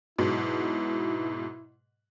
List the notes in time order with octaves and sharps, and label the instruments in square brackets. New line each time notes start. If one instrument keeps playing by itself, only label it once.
[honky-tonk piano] G#2 B2 F#3 [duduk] E4